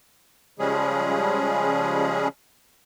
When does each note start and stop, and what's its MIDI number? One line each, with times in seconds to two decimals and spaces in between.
0.59 2.28 49
0.59 2.28 53
0.59 2.28 55
0.59 2.28 56
0.59 2.28 61
0.59 2.28 68